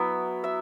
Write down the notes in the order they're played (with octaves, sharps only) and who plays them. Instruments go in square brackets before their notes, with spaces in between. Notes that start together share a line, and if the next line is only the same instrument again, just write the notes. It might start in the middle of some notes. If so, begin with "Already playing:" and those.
Already playing: [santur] F#3 B3 E4
E5